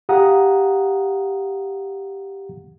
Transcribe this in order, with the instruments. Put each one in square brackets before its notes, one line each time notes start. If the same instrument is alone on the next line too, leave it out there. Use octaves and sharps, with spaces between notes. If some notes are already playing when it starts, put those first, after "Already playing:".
[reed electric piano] G4 F5 F#5 A#5 D#6